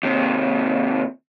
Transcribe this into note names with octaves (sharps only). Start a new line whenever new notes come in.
D#2 C3